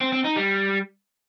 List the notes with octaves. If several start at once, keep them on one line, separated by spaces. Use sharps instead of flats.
C4
C4
D#4
G3